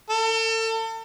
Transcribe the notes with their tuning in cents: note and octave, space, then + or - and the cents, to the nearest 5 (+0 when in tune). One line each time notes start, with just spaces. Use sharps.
A4 +35